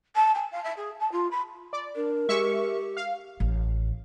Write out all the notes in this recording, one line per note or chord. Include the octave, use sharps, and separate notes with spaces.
A5
G#5
F5
E5
G#4
A5
F4
B5
D5
D4 A#4
G#3 G4 E5 C#6
F5
A1